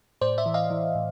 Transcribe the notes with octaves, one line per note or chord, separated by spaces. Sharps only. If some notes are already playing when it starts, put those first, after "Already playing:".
A2 C5 D5
D5 E5
E3
D#5 F5
E3
A2